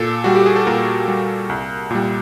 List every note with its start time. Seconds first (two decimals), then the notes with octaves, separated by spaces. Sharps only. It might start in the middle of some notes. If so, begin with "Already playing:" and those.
Already playing: A#2 A4
0.24 G3 F#4
0.36 G4
0.46 G#4
0.56 A4
0.67 A#2 A#4
1.08 G3
1.49 C2
1.90 A#2 G3